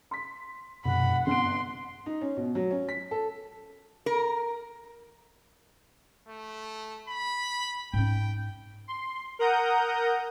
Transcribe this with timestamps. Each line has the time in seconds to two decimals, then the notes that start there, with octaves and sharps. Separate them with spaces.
0.11 C6 B6
0.85 F1 F#2 B2 F#5 B5
1.27 G1 C4 C6 F#6 D7
2.06 D#4
2.21 C#4
2.37 B2
2.55 F#3
2.71 C#4
2.89 B6
3.11 A4
4.06 A#4
6.28 A3
7.09 B5
7.94 G#2 C#4 G5
8.88 C6
9.39 A#4 F#5 A#5 D#6 G6